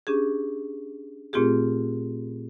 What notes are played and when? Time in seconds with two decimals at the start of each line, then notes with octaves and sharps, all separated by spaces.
0.07 C#4 D4 G4 G#4
1.33 A#2 A3 C4 F4 G4 G#4